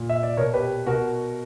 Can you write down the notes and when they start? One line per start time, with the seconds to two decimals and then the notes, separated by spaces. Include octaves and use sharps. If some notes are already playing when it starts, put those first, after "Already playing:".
Already playing: A#2
0.09 E5
0.23 D5
0.37 B2 A#4 C#5
0.54 G4 B4
0.87 B2 F#4 A#4